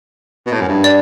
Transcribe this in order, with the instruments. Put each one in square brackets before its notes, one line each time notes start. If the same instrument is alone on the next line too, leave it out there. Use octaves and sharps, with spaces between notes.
[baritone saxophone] B2
A2
F#2
G2
[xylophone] D5